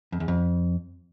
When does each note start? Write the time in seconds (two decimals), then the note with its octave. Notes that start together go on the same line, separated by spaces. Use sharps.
0.12 F2
0.20 E2
0.28 F2